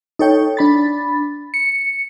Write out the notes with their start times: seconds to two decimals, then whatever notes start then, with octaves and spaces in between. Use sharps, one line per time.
0.19 D#4 A4 C#5 G5
0.57 D4 B5 A6
1.54 C#7